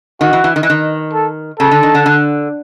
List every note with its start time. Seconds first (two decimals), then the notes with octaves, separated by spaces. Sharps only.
0.21 D#3 F#4
0.33 E3
0.44 E3
0.56 D#3
0.63 E3
0.70 D#3
1.13 A4
1.59 C#3 A4
1.71 D3
1.83 D#3
1.95 D3
2.06 D3